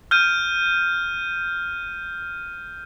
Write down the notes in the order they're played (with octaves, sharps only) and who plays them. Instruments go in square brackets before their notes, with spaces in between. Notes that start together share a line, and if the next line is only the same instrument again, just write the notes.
[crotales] F6 G6 D#7